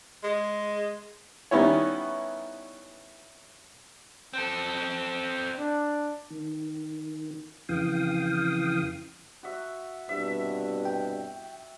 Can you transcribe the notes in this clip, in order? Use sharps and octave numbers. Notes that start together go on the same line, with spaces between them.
G#3
D#3 G3 B3 C#4 E4 C#5
C4 A4
D4
D#3
F2 C#3 E3 F5 G5 D#6
F#4 E5
C2 G2 B2 E5
G5